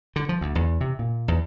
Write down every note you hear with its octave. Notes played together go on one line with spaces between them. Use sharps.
D3
F3
D2
E2
C3
A#2
E2